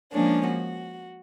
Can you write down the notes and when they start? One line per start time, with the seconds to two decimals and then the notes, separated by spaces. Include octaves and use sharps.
0.12 F3 G#3 A#3 C#4 D4
0.47 F#4